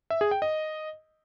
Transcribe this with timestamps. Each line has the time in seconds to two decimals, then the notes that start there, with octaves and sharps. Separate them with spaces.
0.10 E5
0.21 G#4
0.31 G5
0.42 D#5